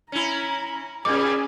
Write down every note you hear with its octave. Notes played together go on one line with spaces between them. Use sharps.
C#4 E4 A#5
A#2 G3 C#4 G#4 D6 G#6